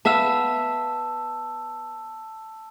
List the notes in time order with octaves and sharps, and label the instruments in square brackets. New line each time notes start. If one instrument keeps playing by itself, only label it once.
[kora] B3 E5 F5 [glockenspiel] A5 E6